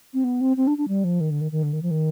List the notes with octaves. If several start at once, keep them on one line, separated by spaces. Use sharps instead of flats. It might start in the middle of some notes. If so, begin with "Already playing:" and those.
C4
B3
C4
C4
D4
D4
G3
F3
D#3
D3
D#3
D#3
D3
D#3
F3
D#3